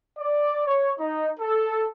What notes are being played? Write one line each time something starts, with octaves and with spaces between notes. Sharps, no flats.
D5
C#5
D#4
A4